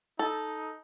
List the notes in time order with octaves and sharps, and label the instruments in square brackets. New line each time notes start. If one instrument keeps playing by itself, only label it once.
[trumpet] D#4 [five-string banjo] A4